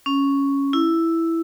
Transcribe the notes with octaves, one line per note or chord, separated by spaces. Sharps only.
C#4
E4